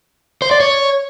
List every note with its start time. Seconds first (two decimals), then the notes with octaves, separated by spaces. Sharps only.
0.42 C5
0.51 D5
0.60 C#5